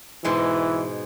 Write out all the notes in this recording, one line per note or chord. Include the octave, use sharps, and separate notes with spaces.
G#2 B2 E3 G#3